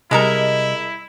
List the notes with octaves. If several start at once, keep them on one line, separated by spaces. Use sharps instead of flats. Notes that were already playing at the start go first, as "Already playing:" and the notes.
C3 G3 G#3 E4 A4 A#4 D#5